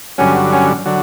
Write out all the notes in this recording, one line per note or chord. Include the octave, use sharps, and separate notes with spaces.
G2 D3 F#3 C#4
C#4
D3 F#3